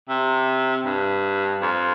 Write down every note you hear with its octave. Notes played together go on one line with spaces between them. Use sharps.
C3
G2
F2